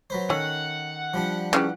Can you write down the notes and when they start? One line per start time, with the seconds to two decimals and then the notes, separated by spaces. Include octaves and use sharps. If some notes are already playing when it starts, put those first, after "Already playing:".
0.10 F#3 B4 C5
0.30 D#3 A3 C#4 F#5
1.14 F3 G3 D4
1.53 C#3 E3 F4 G4